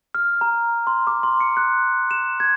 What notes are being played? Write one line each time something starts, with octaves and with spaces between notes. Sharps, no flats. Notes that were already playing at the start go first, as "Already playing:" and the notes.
F6
A#5
C6
D6
C6
C#7
F#6
E7
G#6